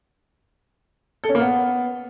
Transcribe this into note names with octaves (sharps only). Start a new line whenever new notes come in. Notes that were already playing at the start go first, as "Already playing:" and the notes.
A4
C#4
A#3
B3